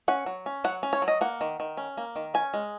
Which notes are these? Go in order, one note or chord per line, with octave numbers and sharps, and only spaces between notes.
C#4 F#5
F#3
C#4
F#3 F#5
C#4
C#5
F#3
D#5
A#3 F#5
D#3
D#3
C#4
A#3
D#3
C#4 G#5
G#3